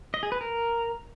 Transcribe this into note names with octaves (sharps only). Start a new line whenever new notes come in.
D#5
G#4
B4
A#4